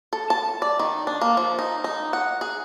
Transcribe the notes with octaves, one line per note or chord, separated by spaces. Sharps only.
A4
A5
D5
D#3
D4
A#3
F3
D#4
D#4
F#5
G#4